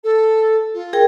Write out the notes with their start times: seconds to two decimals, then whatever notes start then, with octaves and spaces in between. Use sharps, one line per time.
0.04 A4
0.74 F4
0.93 G#4 A#4 G5